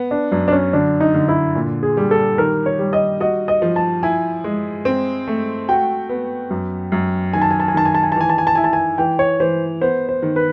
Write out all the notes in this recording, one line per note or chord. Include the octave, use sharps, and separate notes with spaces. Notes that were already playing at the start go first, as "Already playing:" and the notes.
Already playing: B3
D4
F#2 D4
D4
C#4
D3 D4
D#4
D3
E4
A#2
G#4
G3
A4
D#3 A#4
C#5
G3
D#5
F#4 D#5
D#5
F3
A5
E4 G#5
G#3
C4
A3
F#4 G5
B3
F#2
F#2
D#3 G#5
A5
G#5
A5
G#5
D#3 A5
G#5
A5
G#5
A5
E3 G#5
A5
G#5
A5
E4 G#5
A5
G#5
E3 G5
C#5
E3 C5
B3 C5
C5
D#3
B4